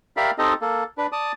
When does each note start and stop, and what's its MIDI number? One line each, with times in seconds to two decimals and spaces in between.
0.17 0.31 67
0.17 0.31 70
0.17 0.31 74
0.17 0.31 76
0.17 0.31 77
0.17 0.31 83
0.38 0.53 60
0.38 0.53 63
0.38 0.53 67
0.38 0.53 69
0.38 0.53 75
0.62 0.84 58
0.62 0.84 69
0.98 1.07 62
0.98 1.07 71
1.12 1.32 74
1.12 1.32 81
1.12 1.32 87